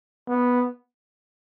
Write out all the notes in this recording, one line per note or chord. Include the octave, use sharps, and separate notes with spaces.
B3